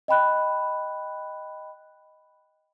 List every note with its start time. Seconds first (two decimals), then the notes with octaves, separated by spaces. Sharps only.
0.08 D#5 G5 B5 F#6